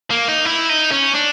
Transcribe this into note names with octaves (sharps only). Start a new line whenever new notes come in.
A#3
D#4
E4
D#4
C#4
D4